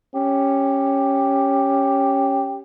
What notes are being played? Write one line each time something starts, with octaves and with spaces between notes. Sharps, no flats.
C#4 G4